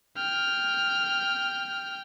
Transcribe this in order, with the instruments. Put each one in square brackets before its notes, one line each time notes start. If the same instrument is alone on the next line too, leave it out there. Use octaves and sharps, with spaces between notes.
[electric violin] G5 F6